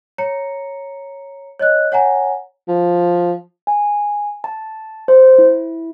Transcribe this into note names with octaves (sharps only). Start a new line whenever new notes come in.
C#5 A#5 C#7
C#5 D#5 F#6
C#5 F#5 G#5 A#5
F3
G#5
A5
C5
E4